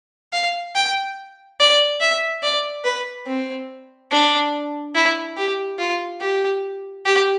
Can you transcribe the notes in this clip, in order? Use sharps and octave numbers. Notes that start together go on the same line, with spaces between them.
F5
G5
D5
E5
D5
B4
C4
D4
E4
G4
F4
G4
G4